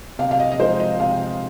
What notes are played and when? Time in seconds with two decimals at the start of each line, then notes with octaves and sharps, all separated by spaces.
0.19 C3 F5
0.31 F5
0.40 D#5
0.52 D#5
0.60 F3 G#3 D#4 C5
0.80 D#5
1.00 C3 F5